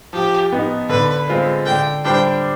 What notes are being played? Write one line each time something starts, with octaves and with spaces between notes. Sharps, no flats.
F3 G4
B3 D#4
D3 B4
G#3 C4 F4 B4
D3 G5
G3 D4 G4 C5 G5